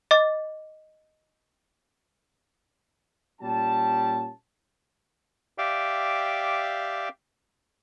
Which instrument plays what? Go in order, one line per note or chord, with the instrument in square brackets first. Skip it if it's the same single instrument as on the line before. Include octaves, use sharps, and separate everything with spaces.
[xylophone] D#5 D6 A6
[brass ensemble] A#2 G3 C#4 A5
[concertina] G4 D5 E5 F5 G5